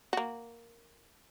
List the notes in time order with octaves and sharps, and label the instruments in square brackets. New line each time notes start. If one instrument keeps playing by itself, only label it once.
[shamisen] A#3 F#4